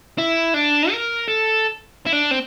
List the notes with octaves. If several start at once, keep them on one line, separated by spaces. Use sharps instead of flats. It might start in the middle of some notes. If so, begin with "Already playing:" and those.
E4
D4
A#4
A4
E4
D4
C4